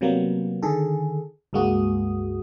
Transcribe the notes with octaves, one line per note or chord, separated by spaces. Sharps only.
C3 F#3 G3 A#3 B3
D3 D#3 G#4 A4
C#2 G2 G#3 A#3 F#4 D#6